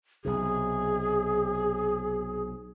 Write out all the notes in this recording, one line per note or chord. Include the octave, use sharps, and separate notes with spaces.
B1 C3 G#4